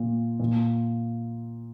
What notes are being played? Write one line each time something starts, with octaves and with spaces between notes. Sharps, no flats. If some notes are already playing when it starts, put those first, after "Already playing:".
Already playing: A#2
A#2